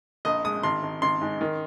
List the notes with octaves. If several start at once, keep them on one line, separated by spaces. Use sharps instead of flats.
A#1 D#5
G#3 D#6
G#1 C6
G#1
G#1 C6
G#2
D#3